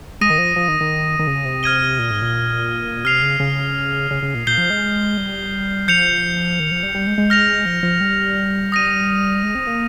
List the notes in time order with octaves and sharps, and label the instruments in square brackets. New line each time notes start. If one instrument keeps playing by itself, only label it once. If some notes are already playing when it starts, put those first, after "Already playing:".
[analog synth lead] G#3 [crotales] D#6 A#6 D#7
[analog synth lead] D#3
F3
F3
D#3
D#3
D#3
C#3
C3
[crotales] F6 G#6 D#7 G7
[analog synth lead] A#2
G#2
A#2
[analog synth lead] C3 [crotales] F6 C7 F7
[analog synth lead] C#3
C#3
C#3
C#3
A#2
[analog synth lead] A#2 [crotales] G6 C7 G7
[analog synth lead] F3
G#3
G3
[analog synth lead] F3 [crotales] G6 C#7 F7
[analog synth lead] D#3
F3
G3
G3
G#3
G#3
[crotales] F6 A#6 F7
[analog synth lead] F3
F3
G3
[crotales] D#6 A#6 D#7
[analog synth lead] G#3
C4
A#3